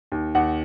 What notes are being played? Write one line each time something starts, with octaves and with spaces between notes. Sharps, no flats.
D#2
D#2 F#5